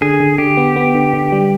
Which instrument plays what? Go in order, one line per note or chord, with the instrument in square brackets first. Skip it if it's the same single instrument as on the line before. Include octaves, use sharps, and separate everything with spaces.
[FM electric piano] D3 [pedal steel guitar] G#4
[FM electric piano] D3
[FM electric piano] D3 [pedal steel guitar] G4
[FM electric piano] B3
B3
D3
D3
G3